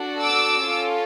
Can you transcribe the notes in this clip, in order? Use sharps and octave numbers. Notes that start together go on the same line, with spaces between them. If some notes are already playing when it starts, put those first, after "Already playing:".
Already playing: D4 F#4 A4
D6 E6
C#4 F4 A4